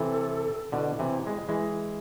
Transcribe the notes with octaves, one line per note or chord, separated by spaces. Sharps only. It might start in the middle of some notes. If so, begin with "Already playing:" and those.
Already playing: C3 E3 A4
B2 D3 E4
C3 E3
G#3
E3 G#3